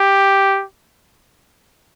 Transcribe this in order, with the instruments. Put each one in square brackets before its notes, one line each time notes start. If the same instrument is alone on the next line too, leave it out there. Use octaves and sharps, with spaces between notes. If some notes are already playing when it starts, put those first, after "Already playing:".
Already playing: [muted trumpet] G4